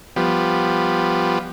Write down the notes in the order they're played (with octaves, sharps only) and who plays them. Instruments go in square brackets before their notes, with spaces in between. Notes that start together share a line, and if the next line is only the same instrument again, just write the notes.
[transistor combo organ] F3 G3 B3